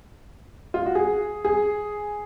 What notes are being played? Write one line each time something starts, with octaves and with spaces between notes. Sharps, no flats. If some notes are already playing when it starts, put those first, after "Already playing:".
F4
F#4
G#4
G#4